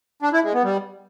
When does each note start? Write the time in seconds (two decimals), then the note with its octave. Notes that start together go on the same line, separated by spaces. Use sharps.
0.22 D4
0.33 E4
0.43 G#3
0.53 B3
0.64 G3